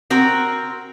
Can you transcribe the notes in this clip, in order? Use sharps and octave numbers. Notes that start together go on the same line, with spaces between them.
C4 F#4 A#4